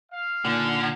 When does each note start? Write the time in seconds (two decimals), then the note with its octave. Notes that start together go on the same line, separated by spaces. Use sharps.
0.12 F5
0.45 A#2 D3 D#4 G#5